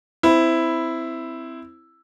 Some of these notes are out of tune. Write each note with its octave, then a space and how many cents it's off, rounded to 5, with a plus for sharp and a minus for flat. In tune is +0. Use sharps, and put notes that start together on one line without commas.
C4 -10 E4 +0